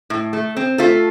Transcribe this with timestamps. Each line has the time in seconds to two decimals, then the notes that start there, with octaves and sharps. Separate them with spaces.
0.10 A2
0.33 A3
0.57 C4
0.78 A3 F4 A4